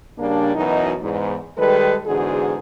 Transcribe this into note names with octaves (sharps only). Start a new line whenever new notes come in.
C#3 G3 A#3 D4
F#2 B2 E3 D#4
E2 G#2
D#3 G3 G#3 A4 B4
E2 G#2 D3 F#4 G#4